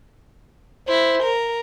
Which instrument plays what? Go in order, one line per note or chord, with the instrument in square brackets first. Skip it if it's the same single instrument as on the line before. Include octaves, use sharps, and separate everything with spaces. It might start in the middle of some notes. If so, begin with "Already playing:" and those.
[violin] E4 [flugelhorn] C5
[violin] A#4